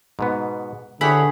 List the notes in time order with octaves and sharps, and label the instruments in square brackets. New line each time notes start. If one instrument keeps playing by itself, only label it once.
[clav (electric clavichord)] G#2 B2 B3
[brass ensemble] D3 [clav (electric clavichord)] E4 G4 C#5 [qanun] G#4 B4 B5